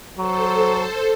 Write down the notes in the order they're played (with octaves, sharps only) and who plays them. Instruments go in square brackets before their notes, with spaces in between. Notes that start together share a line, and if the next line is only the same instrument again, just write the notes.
[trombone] F#3 [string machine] A4 C5